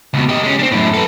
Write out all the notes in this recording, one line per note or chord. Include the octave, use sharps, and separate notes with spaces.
C#2 B2
G4 D#5
G#3 C#4
C4 D4
F#2 A2
A4 B4